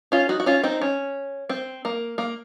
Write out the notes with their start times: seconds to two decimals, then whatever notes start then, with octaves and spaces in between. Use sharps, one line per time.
0.12 C#4 F4
0.29 D#4 F#4
0.40 F#4
0.46 C#4 F4
0.63 C4 D#4
0.81 C#4
1.49 C4
1.85 A#3
2.18 A#3